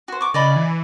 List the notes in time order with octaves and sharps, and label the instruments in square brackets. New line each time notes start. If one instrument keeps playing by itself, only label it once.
[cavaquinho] F#4 C5
C#6 D6
[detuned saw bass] C#3 [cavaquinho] D5 D#5 B5
[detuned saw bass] E3